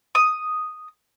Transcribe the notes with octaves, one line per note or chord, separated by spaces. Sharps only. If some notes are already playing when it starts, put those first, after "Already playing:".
D#6